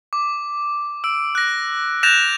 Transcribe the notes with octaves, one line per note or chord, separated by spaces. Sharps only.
D6
E6 D7
F#6 A#6
F#6 G6 A6 A#6 E7 F7